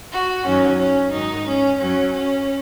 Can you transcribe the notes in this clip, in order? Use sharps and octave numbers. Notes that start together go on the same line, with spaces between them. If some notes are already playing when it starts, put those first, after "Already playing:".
F#4
F#2 D#3 F#3 C#4
C#4
G#2 D#3 F#3 D#4
C#4
F#2 F#3 C#4
C#4